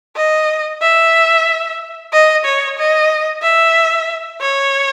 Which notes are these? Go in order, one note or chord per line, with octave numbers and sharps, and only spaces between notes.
D#5
E5
D#5
C#5
D#5
E5
C#5